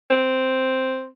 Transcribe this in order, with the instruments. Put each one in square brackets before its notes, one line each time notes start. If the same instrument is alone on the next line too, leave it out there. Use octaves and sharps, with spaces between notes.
[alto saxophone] C4